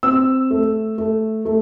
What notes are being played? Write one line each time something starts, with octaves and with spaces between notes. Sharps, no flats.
C4 E6
A3
A3
A3